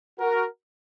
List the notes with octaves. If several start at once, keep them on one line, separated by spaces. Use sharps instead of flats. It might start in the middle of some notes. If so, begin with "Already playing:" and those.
F#4 A#4